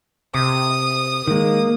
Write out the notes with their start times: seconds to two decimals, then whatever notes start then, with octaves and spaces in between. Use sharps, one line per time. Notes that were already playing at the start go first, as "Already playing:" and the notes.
0.35 C3 D#6
1.27 D#3 G#3 A#3